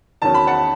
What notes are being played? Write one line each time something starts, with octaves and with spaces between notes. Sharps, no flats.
E2 D#3 F#3 C#4 A5
B5
F#5 A5